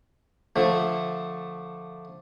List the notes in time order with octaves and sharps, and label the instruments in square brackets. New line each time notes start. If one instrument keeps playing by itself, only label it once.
[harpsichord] D3 F3 A3